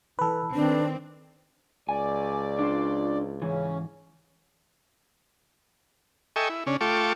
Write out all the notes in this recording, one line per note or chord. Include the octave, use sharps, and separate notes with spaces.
E3 A4 B4
D#3 C4 D4
C#2 D5 G#5
D4 F4 C5
G#2 C#3 E3 C#4
A4 D#5 E5 G5 G#5 C#6
E4
C#3 C#4 D4
A3 F4 G5 A5 C#6 D6